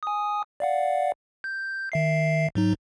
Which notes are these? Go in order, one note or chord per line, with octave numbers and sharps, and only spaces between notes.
G#5 D#6
D5 F5 F#5
G6
D#3 E5 C7
G#2 F#3 D#4